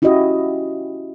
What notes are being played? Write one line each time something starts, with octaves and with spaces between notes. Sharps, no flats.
C#4 E4 F#4 G4 D#5